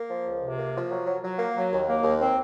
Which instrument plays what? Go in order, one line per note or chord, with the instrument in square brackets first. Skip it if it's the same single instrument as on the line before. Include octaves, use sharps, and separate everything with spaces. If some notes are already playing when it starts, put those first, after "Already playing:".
Already playing: [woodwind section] A#3
F3
C#2
C3
A#3
F3
F#3
F#3
F#3
A#3
F#3
D#2
A#3
D#2
C4